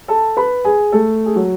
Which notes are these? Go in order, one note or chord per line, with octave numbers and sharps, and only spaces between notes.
A4 A5
B4 B5
G#4 G#5
A3 A4
G#4
F#3 F#4